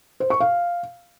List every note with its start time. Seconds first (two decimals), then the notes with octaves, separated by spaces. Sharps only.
0.20 C5
0.30 C#6
0.40 F5